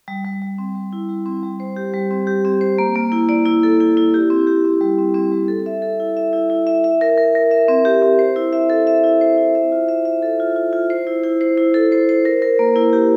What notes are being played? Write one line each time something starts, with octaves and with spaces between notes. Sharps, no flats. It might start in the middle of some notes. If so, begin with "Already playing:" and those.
G3
G3
G3
C4
G3
E4
G3
C4
G3
C5
G4
G3
C4
G4
C4
C5
A#3
A#3
E4
D5
E4
A4
E4
E4
G4
C4
G4
C4
G3
C4
C4
G3
A4
E5
A4
E4
E5
E4
E4
E5
E5
A#4
A#4
A#4
E5
C4
G4
C4
C5
E4
E5
A4
E5
E4
C5
E4
E5
F4
E5
E5
A4
F4
F4
F4
C5
E4
E4
C5
E4
A4
C5
C5
A#4
A#4
A#3
E4
G4